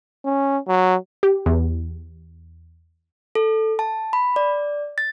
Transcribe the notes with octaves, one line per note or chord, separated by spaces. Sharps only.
C#4
F#3
G4
E2
A4
A5
B5
D5
A6